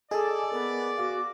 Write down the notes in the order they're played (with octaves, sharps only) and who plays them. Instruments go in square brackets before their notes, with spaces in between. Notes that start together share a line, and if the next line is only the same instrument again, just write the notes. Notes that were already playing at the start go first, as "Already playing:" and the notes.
[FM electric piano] G#4 [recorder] A4 [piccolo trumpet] D5 [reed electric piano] D#5 D#6
[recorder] B3 [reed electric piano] A#4
[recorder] F#4 [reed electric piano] F5 D6